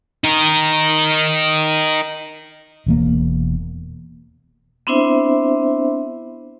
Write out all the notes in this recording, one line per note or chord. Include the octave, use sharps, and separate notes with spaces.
D#4 A#4
E1 E2 A#3
B3 C4 D4 E4 C5 E5